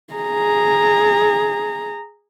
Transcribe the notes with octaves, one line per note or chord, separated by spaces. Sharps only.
G#4 A#5